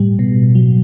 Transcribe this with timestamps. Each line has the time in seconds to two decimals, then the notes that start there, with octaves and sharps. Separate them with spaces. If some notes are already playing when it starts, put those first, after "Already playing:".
Already playing: A2 G3
0.19 B2
0.55 F#3